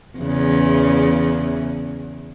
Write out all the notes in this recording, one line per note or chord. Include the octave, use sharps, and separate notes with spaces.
E2 C#3